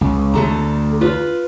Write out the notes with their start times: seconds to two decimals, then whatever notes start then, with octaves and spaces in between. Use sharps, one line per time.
0.01 C#2
0.34 D2 A3 A4 A#5
1.01 F4 B4